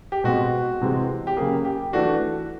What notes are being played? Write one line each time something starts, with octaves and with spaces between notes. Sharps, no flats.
G4
B2 G#3 C4 F#4
C3 E3 G#3 C4
G4
C#3 F#3 A#3 G#4
G4
E3 A3 D4 F#4